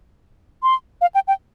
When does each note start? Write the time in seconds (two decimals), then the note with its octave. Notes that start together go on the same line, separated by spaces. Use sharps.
0.63 C6
1.01 F5
1.15 G5
1.28 G5